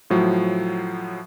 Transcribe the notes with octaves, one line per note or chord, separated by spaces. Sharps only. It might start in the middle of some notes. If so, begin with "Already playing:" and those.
A2 F3 F#3